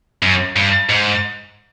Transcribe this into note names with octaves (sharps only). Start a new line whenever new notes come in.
F#2
G2
G#2